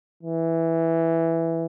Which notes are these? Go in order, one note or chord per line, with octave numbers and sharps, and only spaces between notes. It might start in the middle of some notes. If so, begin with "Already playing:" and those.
E3